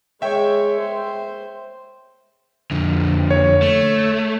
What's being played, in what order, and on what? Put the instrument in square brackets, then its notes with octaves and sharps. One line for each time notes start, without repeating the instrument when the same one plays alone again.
[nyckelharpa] G#3 C#5 [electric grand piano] E5 G5
[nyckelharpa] C5
[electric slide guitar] F2 D3
[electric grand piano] C#5
[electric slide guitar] A3